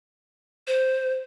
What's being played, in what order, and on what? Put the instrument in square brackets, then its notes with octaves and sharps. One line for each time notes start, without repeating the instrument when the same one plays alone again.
[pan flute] C5